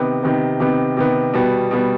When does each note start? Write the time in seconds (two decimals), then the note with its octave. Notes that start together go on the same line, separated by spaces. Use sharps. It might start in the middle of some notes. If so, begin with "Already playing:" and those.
Already playing: C3 D#3 B3
0.23 C3 D#3 B3
0.60 C3 D#3 B3
0.97 C3 D#3 B3
1.33 B2 G3 B3
1.71 B2 G3 B3